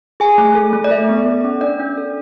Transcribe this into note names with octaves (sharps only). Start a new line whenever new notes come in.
G#4 G#5
A3
A4
A3
D5
A4 E5
B3
A4
C#4
D4 D5
D4
A4